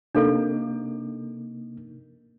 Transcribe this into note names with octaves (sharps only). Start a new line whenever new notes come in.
C3 A#3 D4 D#4 A4